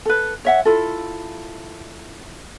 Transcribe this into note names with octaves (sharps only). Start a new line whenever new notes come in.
A4 B4
C#5 E5 F#5
E4 F4 A4